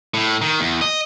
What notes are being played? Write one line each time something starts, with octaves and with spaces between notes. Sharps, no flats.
A2
D#3
E2
D#5